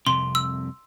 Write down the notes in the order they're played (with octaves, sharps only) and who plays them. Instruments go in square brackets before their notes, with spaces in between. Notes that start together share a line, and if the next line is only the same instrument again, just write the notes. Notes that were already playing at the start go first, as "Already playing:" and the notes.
[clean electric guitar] C2 F2 C3 [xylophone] C6
[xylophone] E6